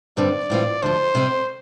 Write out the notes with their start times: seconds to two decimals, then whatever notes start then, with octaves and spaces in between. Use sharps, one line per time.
0.17 G2 D3 G3 C4 D5
0.50 A2 E3 G3 C4 F4
0.82 D2 D3 F3 C5
1.15 C3 G3 C4 G4